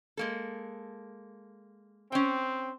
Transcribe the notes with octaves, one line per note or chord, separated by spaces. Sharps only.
G#3 A#3 A4
C4 C#4 G5